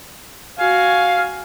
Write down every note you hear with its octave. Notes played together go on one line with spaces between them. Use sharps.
F#4 F5 G#5